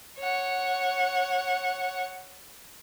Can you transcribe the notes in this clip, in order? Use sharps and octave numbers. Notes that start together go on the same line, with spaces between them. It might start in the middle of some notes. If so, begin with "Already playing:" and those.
C#5 F#5